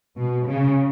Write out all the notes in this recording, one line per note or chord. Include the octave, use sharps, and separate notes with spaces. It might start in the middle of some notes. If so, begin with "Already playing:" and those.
B2
C#3